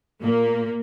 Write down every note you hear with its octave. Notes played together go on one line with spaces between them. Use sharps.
A#2 A#3